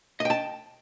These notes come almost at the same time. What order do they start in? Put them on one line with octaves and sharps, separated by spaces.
D#5 G5 A5